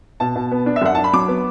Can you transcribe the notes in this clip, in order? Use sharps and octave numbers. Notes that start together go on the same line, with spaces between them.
B2 A5
B2
B3
D4
E5
F#2 F#5
D4 A5
B5
F#3 D6
B3